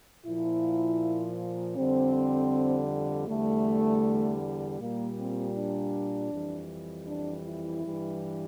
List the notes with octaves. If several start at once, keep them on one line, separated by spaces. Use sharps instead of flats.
A#2 F3 E4
F2 D3 G3 C4
E2 D3 G3 A3
A#2 G3 A#3
C4
D4
F2 E3 G3
D4
E4
G2 E3 G3